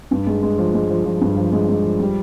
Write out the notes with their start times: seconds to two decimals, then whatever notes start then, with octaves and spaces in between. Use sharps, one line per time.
0.11 G2
0.27 G#3
0.42 G#3
0.58 F3
0.74 G#3
0.90 F3
1.05 F3
1.21 G2
1.37 F3
1.52 G#3
1.69 G#3
1.84 F3
2.00 G3